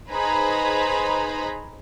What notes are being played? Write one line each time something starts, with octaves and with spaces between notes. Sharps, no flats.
D#4 G#4 B4 C5 A#5 B5